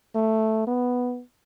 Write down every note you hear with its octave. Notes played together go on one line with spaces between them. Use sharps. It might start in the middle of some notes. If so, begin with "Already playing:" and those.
A3
B3